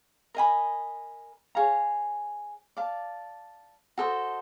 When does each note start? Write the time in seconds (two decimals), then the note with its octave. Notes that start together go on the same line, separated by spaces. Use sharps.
0.35 A#4 D#5 G#5 B5
1.55 G#4 C#5 F5 A#5
2.77 D5 F5 A5
3.98 F#4 A4 C5 D#5